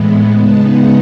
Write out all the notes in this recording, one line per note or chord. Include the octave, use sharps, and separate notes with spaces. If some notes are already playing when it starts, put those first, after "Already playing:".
Already playing: A2 E3 G#3 B3
C#3 G#3 B3 D#4 A5
F#5